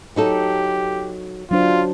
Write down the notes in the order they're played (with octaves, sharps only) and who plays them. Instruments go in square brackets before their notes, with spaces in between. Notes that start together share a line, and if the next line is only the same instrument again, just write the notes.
[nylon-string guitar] F#3 D#4 A4 [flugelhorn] G4
[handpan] F#3 D4 C5 [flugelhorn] F4